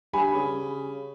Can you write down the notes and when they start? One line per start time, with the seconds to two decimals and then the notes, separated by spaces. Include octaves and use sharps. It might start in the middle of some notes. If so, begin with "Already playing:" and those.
0.13 G2 G4 G#5 B5
0.34 C#3